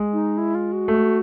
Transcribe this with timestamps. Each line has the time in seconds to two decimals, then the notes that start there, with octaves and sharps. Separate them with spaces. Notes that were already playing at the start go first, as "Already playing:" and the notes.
Already playing: G#3
0.13 D#4
0.38 E4
0.55 F4
0.72 F#4
0.88 A3